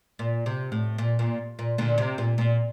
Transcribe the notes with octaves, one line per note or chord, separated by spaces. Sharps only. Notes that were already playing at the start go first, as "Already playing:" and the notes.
A#2
C3
A2
A#2
A#2
A#2
A#2 D3
C3
A#2
A#2